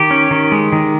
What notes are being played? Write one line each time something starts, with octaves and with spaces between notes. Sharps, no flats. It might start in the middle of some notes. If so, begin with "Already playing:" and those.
Already playing: D#3 G4
C#4
D#3
G#3
D#3